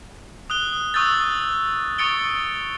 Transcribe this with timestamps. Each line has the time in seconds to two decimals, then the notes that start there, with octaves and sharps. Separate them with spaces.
0.50 D#6 F#6 G7
0.94 C#6 D#6 E6 F#6 G6 A6
1.98 C#6 D#6 A6 C#7 D7 G7